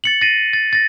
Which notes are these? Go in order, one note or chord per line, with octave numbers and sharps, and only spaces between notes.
A6 C#7 F#7
A6 A#6 C7 D#7
A6
A6 A#6